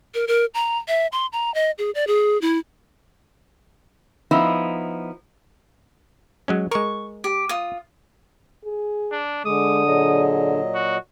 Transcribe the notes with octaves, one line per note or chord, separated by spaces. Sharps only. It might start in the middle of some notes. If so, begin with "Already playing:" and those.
A#4
A#4
A#5
E5
C6
A#5
D#5
G#4
D5
G#4
E4
F3 B3 D#4 E4
F#3 G#3 C#4
G#3 A#4 C#6
G4
F4 D#6
G#4
D4
D3 G#3 D6 D#6
A#2 F#3 G#4 D#5
F#4